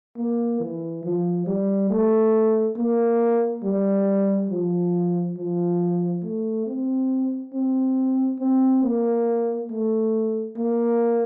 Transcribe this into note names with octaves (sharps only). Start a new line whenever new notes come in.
A#3
E3
F3
G3
A3
A#3
G3
F3
F3
A3
C4
C4
C4
A#3
A3
A#3